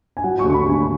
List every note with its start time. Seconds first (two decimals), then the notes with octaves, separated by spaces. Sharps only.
0.17 G#5
0.24 F#3 F#5
0.39 C#6
0.44 D2
0.50 C#6
0.54 B5
0.64 D2 G#5